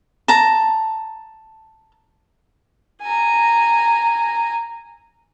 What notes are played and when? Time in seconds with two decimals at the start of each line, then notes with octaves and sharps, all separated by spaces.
0.28 A5 A#5
3.02 G#5 A#5